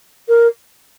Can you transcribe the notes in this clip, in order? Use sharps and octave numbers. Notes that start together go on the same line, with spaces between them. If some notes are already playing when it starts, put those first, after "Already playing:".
A#4